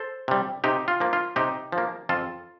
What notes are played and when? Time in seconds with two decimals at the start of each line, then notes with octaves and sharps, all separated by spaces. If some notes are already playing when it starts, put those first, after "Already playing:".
Already playing: A4 C5
0.28 C3 G3
0.64 C3 D#4 G4
0.88 F4
1.00 F3 A#3
1.13 F4
1.36 C3 D#4 G4
1.72 F3
1.78 A#3
2.09 F2 F4 A4